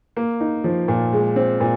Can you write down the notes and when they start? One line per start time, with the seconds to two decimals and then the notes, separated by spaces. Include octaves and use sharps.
0.17 A#3
0.40 D#4
0.64 F3
0.88 A#2
1.13 G#3
1.36 C4
1.61 A#2